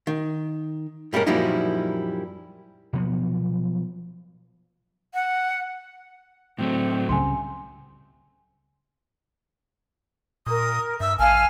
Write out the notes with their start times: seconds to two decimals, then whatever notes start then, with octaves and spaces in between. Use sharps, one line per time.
0.07 D#3
1.13 G2 G3 G#3 C#4 A#4
1.27 F#2 A#2 F3 G3 D#4 E4
2.93 B2 F3 F#3 B3
5.14 F#5
6.59 A2 F#3 A3 C4
7.09 C#2 C#3 G3 G#5 C6
10.46 A#2 A#4 D#6
11.00 G2 E5 E6
11.19 A1 F5 G#5 A5 F6